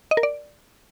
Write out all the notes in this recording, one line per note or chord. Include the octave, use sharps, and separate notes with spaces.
D#5
A#4
D5